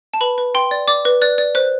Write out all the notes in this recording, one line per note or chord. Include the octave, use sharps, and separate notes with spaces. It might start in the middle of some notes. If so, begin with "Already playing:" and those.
A5
B4 B5
B4
G5 C6
D5
D5 D6
B4
D5 F#6
D5
C5 F#6